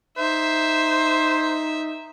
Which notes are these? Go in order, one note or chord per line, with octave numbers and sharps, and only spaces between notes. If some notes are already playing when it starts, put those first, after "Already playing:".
D#4 C5 E5